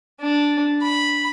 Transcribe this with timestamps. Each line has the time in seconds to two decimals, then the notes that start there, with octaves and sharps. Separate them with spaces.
0.20 D4
0.82 B5